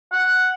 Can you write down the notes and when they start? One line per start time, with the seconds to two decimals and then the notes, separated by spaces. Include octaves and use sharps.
0.13 F#5